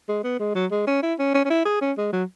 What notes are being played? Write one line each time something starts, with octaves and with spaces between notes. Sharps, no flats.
G#3
B3
G#3
F#3
G#3
C#4
E4
C#4
C#4
C#4
E4
G#4
C#4
G#3
F#3